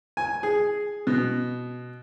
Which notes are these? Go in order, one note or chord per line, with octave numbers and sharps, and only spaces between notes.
G#5
G#4
B2